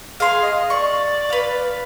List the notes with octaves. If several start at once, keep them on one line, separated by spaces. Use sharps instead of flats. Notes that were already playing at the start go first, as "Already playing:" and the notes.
G#4 F5 C6
D#5
D5 C#6
B4 F5